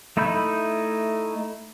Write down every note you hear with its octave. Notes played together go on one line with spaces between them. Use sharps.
A3 D#4 E4 B5 G6